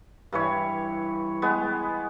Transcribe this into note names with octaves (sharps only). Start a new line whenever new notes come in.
G2 E3 C#5
G#3 B3